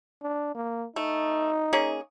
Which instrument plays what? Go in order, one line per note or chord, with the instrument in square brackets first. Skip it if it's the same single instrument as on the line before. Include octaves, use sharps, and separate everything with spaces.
[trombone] D4
A#3
[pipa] A3 [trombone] D#4
[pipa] A#3 C#4 G#4